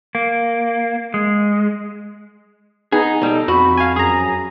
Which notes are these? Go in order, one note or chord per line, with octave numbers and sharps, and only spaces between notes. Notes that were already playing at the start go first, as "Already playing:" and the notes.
A#3
G#3
B3 D#4 G#4
B1 G3 A4
F2 F#4 B5
F5 G#5
F#2 G#4 A#5